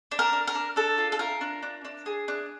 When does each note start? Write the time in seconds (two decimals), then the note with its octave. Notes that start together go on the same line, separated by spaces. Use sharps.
0.11 D4
0.19 A#4
0.33 D4
0.48 A#4
0.55 D4
0.76 D4 A4
0.98 F4
1.12 A4
1.19 F4 A#4
1.41 D4
1.62 D4
1.85 D4
2.06 G#4
2.28 D4